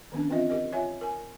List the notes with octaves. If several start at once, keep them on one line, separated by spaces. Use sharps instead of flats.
D#3 F3 B3 C#4 D4
E3 C4 F4 D#5 E5
G4 A#4 D#5
F4 C#5 E5 G#5
A#4 G#5